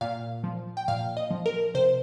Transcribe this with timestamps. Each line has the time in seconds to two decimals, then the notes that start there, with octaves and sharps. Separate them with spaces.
0.01 A#2 F5
0.44 F3
0.77 G5
0.88 A#2 F5
1.17 D#5
1.31 F3
1.46 A#4
1.74 C3 C5